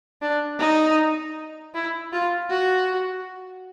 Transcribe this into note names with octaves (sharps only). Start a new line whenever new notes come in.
D4
D#4
E4
F4
F#4